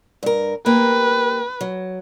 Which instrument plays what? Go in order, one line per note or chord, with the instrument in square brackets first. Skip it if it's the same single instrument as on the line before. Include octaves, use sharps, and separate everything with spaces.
[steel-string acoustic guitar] G2 A#4
[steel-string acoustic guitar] A#3 G4 A#4 [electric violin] B4
[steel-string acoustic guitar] F#3